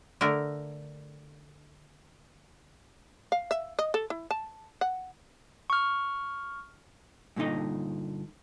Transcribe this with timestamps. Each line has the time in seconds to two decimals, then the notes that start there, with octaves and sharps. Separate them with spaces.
0.21 D3 A3 A#4
3.32 F5
3.51 E5
3.79 D#5
3.94 A4
4.10 E4
4.31 A5
4.81 F#5
5.70 C#6 F6
7.36 G2 A#2 D3 D#4 D#5